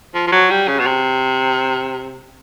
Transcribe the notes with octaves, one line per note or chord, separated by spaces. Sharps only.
F3
F3
F#3
G3
C#3
B2
C3